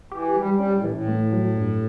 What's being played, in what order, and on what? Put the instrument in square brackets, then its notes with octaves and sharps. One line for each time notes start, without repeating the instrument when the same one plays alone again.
[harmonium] E3 [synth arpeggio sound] G4
[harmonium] G3 [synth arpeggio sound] G4
[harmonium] G3
[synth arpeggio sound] C#4
[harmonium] A2
[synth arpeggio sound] E3
[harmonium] A2
[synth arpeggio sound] A3
F#3
G2